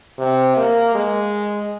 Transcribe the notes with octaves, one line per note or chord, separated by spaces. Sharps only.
C3
A#3
G#3